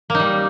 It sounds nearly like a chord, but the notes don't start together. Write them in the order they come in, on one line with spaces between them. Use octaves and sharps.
A#3 D#4 G3